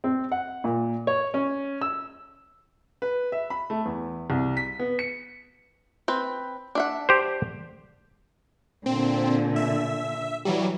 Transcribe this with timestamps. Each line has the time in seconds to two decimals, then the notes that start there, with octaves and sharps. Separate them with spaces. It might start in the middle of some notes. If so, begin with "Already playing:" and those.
0.04 C4
0.32 F#5
0.64 A#2
1.07 C#5
1.34 C#4
1.81 E6
3.02 B4
3.32 E5
3.50 B5
3.70 A3
3.85 E2
4.30 C2
4.57 B6
4.79 B3
4.99 C#7
6.08 C4 B4
6.75 D4 E5 F#5
7.09 G4 C5
8.86 A#2 D3 C4
9.56 E5
10.45 E3 F#3 G3